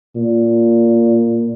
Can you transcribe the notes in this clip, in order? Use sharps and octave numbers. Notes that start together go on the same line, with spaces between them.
A#2